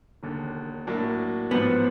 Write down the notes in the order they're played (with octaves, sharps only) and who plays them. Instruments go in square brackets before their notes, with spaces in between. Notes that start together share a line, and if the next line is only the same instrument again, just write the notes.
[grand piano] E1 D#2 D3
A2 F#3 A#3 D4
[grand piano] A1 G#2 F3 [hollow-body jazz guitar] B3